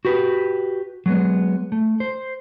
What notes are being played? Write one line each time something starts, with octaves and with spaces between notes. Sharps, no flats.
F#4 G4 B4
F#3 G#3 B3
A3
C5